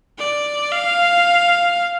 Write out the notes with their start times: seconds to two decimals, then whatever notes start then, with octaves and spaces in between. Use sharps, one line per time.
0.18 D5
0.72 F5